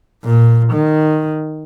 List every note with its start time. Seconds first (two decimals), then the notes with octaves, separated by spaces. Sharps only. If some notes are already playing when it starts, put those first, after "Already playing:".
0.24 A#2
0.73 D#3